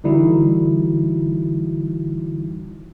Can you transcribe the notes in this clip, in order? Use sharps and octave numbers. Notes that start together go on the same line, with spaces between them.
D3 E3 G3 D#4 E4 F#4